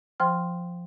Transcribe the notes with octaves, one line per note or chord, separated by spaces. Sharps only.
F3 C5 G5 C6 F6